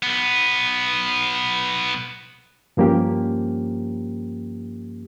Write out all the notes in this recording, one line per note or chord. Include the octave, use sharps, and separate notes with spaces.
B1 B3
G2 F3 A#3 C#4 G4